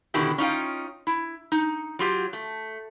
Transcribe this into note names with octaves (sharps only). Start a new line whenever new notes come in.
B2 D3 D#3 B3 E4 G4
C#4 D#4 F4 G5
E4
D#4
F#3 F4 G4
A3